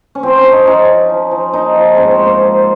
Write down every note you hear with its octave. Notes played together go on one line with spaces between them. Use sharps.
C#4
F3 C4
C#4
F3
D#4
F3 C#4
F3
F3
F3
A#2 D#4
F3
G#2 C#4
C4
G#2
A#3
F3